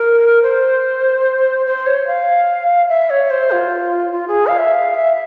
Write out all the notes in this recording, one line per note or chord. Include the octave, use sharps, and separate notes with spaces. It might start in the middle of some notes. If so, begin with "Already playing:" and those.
Already playing: A#4
C5
C5
C#5
F5
E5
C#5
C5
F4
F4
G#4
F5
E5
F5
E5